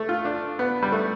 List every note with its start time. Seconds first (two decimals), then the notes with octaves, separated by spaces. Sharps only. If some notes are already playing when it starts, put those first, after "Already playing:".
Already playing: A3
0.09 F4
0.25 D4
0.59 B3
0.83 G3
0.92 A3